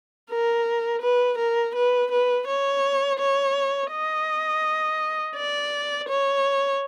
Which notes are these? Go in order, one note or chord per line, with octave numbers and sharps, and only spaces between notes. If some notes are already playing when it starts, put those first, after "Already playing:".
A#4
B4
A#4
B4
B4
C#5
C#5
D#5
D5
C#5